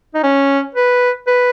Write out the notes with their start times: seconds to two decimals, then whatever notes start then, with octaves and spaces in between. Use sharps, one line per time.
0.15 D#4
0.23 C#4
0.75 B4
1.27 B4